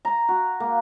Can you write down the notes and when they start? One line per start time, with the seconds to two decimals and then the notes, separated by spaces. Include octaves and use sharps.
0.05 A#5
0.29 F#4
0.60 A#3